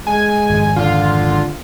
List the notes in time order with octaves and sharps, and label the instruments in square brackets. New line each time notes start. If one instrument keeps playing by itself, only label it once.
[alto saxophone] G#3 [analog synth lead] G#5
[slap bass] G#1 F2
[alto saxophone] D3 [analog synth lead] F4